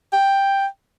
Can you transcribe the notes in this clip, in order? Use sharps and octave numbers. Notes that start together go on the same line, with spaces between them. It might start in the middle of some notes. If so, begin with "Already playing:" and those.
G5